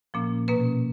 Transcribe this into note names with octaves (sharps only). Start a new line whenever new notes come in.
A#2 F3 A#3 C#4
B2 A#3 C#4 B4